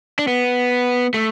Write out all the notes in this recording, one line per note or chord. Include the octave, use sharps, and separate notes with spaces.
D4
B3
A3